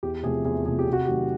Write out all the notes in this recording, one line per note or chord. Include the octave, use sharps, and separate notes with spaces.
E2 G4
C3 F3 A3 G#4
E2 G#4
C3 F3 A3 G#4
G4
C3
F#4
G4
D#3 F#3 A3